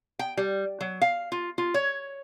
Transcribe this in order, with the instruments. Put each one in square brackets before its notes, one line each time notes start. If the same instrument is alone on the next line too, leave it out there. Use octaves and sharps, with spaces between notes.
[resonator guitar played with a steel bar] G5
G3
F#3
F5
F4
F4
C#5